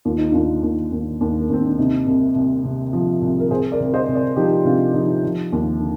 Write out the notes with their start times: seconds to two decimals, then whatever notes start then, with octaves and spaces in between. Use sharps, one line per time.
0.05 D#2 F4
0.18 D#4
0.31 D#2 D4 F4
0.63 D#2
0.92 D#2
1.21 D#2
1.40 A#3
1.50 D#2 C4
1.65 D4
1.78 C3 C4 D#4
2.07 C2
2.35 C2
2.64 C3
2.93 F3
3.21 C2
3.40 A#4
3.50 C2 G#4 C5
3.72 A#4 D5
3.80 C2
3.94 C5 D#5
4.08 C2
4.15 A#4 D5
4.36 F3 D#4 G4
4.65 C3 D4 F4
4.94 F3 D#4 G4
5.23 F3
5.52 D#2
5.80 D3